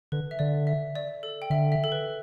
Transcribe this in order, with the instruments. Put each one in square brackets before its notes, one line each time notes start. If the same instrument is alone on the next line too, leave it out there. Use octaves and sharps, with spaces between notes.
[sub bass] D3 [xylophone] B4
[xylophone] E5
[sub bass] D3 [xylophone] D5
[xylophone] E5
D5
A4
G5
[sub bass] D3 [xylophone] E5
[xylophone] E5
A4
B4